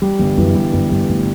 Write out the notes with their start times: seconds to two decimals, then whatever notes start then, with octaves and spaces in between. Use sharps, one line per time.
0.02 E2 G3
0.19 G1 E2
0.38 F#2 E3
0.55 G2 G3
0.73 G1 F#2
0.91 G2 G3
1.09 A2